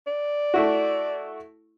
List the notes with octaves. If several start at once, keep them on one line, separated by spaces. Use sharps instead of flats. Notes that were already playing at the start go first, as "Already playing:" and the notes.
D5
A3 E4 F#4